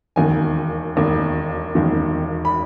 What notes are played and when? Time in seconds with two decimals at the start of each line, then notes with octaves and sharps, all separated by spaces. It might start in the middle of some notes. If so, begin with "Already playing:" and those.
0.16 E1 D#2 D#3 G#5
0.96 E1 D#2 D#3
1.75 E1 D#2 D#3
2.45 B5